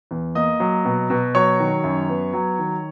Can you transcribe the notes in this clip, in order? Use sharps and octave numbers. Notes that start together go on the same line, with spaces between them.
E2
A#3 D#5 D#6
F#3
B2
B2
F#3 C#5 C#6
D#3
F#2
B3
F#3
D#3